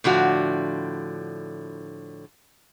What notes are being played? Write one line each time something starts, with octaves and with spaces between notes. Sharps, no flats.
A2 D3 F3 F#4